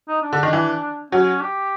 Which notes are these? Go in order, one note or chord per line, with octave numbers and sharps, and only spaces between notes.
D#4
D4
D3
D#3
E3
F#3 C#4
G4